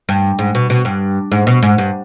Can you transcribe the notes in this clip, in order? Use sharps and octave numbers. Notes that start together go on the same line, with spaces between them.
G2
G#2
B2
B2
G2
G#2
B2
G#2
G2